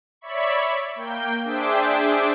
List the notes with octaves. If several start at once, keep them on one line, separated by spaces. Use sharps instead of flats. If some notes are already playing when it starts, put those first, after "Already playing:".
C#5 D5 E5 B5 C#6
A#3 G5 G6
D4 G#4 C5 E5 G5 D6